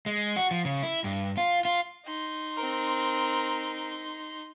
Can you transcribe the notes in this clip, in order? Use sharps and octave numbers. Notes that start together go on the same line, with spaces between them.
G#3
F#4
F3
C#3
E4
G2
F4
F4
D#4 C6
C4 A#4